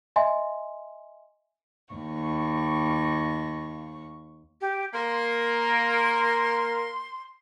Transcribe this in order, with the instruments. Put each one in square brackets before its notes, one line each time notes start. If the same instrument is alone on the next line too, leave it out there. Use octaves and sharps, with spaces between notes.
[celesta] D#5 E5 G#5 C6
[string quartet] D#2 C#6
[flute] G4
[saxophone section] A#3 A#4 [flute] C6